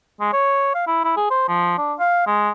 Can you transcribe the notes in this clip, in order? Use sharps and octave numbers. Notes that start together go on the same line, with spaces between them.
G#3
C#5
F5
E4
E4
G#4
C5
F3
D4
F5
G#3